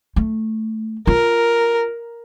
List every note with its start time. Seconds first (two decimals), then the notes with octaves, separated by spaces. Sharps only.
0.16 A3
1.07 F4 A#4